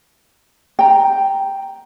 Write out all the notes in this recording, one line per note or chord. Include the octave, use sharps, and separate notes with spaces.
G5 A#5